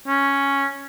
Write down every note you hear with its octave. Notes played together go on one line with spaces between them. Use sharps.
C#4